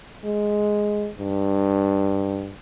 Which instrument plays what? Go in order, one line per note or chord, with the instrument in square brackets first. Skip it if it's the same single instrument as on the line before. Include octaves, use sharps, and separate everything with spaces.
[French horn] G#3
G2